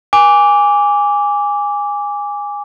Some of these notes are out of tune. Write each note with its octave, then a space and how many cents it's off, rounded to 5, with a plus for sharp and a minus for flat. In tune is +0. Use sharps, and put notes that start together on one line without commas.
G#5 -15 D6 -15